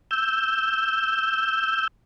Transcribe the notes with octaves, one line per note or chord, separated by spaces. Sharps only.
E6 G6